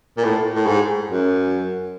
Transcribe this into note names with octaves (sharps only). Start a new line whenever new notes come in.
A#2
A2
A2
G#2
F#2